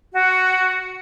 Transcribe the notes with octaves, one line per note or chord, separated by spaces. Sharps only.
F#4